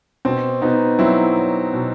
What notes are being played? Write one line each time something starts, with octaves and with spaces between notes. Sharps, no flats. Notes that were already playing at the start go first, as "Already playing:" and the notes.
B2 C4
B2 B3 D#4
F#3 C4 E4
F#3
B2